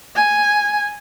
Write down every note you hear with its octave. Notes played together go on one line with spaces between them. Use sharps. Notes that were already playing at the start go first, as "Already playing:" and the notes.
G#5